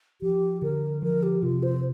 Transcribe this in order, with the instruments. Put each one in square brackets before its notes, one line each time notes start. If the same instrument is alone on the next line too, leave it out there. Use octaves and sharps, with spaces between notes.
[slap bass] F3 [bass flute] G4
[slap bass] D3 [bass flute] A#4
[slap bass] F3 [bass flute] A#4
[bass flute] G4
[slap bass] C3 [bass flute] F4
[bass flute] C5